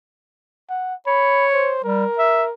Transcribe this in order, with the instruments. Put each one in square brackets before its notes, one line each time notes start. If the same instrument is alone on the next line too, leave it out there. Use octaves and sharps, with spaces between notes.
[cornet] F#5
[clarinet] C#5 [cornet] B5
[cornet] C5
[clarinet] G3 [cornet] A#4
[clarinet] E5